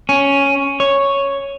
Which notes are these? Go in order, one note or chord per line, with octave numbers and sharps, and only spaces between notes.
C#4
C#5